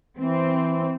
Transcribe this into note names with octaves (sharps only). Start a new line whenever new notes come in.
E3 C4